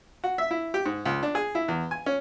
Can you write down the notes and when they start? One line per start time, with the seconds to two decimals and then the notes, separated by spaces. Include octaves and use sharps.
0.24 F#4
0.38 E5
0.51 E4
0.74 G4
0.86 G#2
1.05 C#2
1.23 D4
1.35 G#4
1.55 E4
1.68 E2
1.91 G#5
2.06 C#4